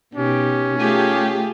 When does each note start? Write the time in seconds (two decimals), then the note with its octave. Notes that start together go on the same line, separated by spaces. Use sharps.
0.15 B2 C#4 D#4 G4
0.79 A3 F4 G4 G#4